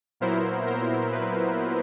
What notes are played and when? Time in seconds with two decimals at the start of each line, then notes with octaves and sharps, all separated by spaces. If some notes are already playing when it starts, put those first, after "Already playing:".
0.20 A#2 F#3 B3 E4 A#4 C5
0.66 A#4 C5
1.12 B4